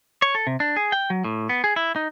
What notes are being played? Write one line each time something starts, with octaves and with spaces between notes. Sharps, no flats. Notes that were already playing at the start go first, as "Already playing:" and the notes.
C#5
A4
C3
D4
G#4
G5
F#3
A2
B3
G#4
E4
D#4